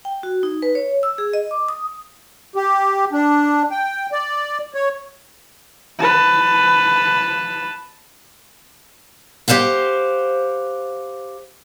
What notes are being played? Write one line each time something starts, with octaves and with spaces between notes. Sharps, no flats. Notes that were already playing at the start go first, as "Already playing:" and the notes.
G5
F#4
D#4
B4
C#5
E6
G#4
D#5
D6
D#6
G4
D4
G5
D5
C#5
B4 A5
G4 A#4 C5 F5 F#5